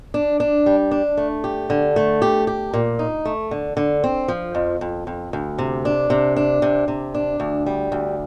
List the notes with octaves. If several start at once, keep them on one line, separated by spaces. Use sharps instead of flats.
D4
D4
G3
D4
A3
G4
D3
A3
G4
G4
A#2
D#4
A3
D3
D3
C4
F3
F2
F2
F2
D2
C3
D4
C3
D4
C3
C3
D4
D2
G3
D2